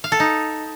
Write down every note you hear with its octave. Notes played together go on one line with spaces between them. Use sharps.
F5
A4
D#4